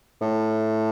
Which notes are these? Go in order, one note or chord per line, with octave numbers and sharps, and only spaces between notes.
A2